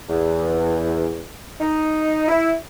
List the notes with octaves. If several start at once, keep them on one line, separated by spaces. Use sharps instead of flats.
E2
D#4
E4